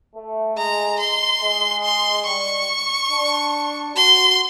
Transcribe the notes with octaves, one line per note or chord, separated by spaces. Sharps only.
A3
G#3 A#5
C6
G#3
C6
G3 C#6
D4
F#4 C6